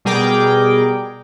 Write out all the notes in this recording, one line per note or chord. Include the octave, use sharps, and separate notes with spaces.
B2 G3 G#4 A#4 G5 D6